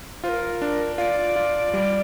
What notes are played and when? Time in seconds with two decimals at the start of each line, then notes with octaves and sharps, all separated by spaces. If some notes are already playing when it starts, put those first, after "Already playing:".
0.24 F4 C5
0.29 A#4
0.62 D4
0.98 F4 D5
1.36 F4
1.74 G3